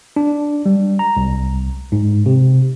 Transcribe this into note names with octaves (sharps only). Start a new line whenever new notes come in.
D4
G3
A#5
C2
G#2
C3